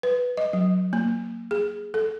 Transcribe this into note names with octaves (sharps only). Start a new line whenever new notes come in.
B4
D#5
F#3
A#3
G#4
A4